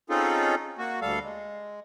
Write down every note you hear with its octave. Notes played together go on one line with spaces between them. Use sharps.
C4 C#4 D#4 F4 G#4 A4
A#3 F#4
D2 G3 A4 F5
G#3